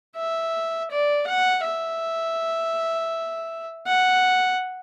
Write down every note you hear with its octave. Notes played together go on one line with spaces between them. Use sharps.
E5
D5
F#5
E5
F#5